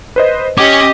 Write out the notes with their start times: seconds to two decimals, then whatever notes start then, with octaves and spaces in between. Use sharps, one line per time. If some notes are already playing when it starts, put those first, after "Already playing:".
0.16 B4 C5 D#5
0.58 C#4 G4 D#5 D6